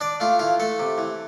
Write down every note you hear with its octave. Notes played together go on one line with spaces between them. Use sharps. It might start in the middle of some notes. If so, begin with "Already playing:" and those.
D4 D5
A3 F4
E3 F4
A3 A4
C3
E3